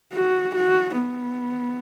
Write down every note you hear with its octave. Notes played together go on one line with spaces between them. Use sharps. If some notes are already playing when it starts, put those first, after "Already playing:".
F#4
F#4
B3